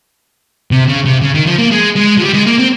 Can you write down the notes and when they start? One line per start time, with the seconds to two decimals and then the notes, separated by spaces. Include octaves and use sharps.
0.71 C3
0.88 C#3
1.05 C3
1.21 C#3
1.34 D#3
1.46 F3
1.58 A#3
1.71 G#3
1.96 G#3
2.18 F3
2.21 G3
2.33 G#3
2.46 A#3
2.59 C4